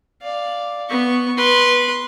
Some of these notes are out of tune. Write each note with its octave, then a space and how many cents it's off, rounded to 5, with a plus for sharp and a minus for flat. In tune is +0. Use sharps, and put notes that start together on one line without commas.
D5 +0 F5 +0
B3 +0 C#6 +0
B4 -15 C6 +0